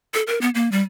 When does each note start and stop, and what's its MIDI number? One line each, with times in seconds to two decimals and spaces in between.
0.14 0.23 69
0.27 0.40 70
0.41 0.50 59
0.55 0.71 58
0.72 0.82 55